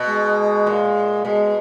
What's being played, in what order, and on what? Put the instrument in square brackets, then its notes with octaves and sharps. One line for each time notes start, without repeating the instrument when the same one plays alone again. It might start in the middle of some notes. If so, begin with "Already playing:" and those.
Already playing: [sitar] B2
[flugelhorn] G#3
[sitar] A#2
[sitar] B2 [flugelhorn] G#3